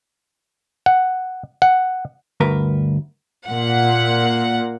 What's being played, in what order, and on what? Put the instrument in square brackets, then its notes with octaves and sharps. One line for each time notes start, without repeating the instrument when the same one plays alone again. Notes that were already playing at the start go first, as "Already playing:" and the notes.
[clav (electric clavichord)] F#5
F#5
[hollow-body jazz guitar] D2 G2 A#4 B4
[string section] A#2 F#5